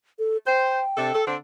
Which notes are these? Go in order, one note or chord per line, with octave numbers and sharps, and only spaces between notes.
A4
C5 G5
C3 D4 A4
A4
D3 C4 D4